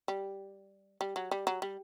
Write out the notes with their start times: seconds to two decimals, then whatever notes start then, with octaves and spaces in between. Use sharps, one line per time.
0.08 G3
1.01 G3
1.16 F#3
1.31 G3
1.47 F#3
1.62 G3